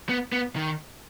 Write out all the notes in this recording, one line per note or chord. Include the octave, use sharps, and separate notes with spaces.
B3
B3
D#3